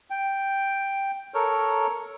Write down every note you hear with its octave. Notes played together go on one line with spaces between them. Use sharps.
G5
A4 A#4 C#5